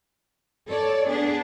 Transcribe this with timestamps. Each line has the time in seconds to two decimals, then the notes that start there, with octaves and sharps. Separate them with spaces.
0.68 A4 C#5 D5
1.08 B3 D4 G#4